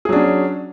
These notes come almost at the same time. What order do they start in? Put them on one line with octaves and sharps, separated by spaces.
G#4 F#3 D4 C#4